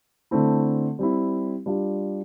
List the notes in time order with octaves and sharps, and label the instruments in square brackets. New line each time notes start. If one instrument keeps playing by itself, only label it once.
[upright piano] D3 A3 C4 E4
G3 C4 E4
G3 D4 F4